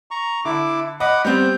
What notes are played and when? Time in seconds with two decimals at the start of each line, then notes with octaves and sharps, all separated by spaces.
0.11 A#5 C#6
0.45 D3 E4 D6
1.00 D#5 F#5 B5 D6
1.25 G3 B3 C4 G6